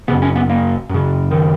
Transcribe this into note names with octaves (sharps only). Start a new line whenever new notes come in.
F#2 C#3 B3
C#4
B3
A#3
F#2 C#3
D#3